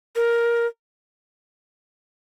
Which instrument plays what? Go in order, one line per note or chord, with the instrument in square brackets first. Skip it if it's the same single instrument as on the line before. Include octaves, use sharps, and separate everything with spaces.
[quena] A#4